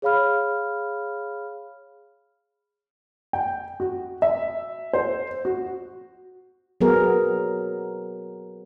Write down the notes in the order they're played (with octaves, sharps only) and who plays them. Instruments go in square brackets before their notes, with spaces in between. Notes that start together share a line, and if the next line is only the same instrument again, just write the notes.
[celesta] G#4 C#5 F5 B5 F6
[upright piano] G5
F#4
E5
C5
F#4
[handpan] F#3 B3 G#4 A#4